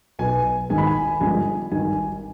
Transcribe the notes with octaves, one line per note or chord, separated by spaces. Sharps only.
B1 B2 B3 G#5
G#1 G#2 D#3 G#3 G#5
B5
G#5
G1 G2 D3 F3 G#3 G#5
G#1 G2 D#3 G#5